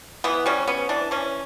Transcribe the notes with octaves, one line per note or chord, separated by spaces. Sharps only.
E3 B3
G3 C#4
B3 C#4
E3 D4
E3 C#4